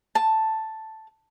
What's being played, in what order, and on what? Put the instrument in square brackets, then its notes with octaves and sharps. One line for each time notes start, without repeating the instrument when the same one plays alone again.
[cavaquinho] A5